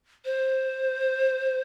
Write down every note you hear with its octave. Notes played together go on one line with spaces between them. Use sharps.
C5